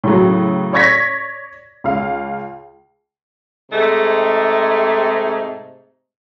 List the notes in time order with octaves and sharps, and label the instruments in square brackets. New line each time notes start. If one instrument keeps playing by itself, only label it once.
[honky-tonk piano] A2 C#3 F#3
C#5 D5 C#6 G#6 A#6 B6
C#2 F5
[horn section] G#2 C3 G#3 A3 D#4